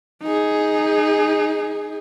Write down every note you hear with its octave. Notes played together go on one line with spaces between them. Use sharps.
D#4 G#4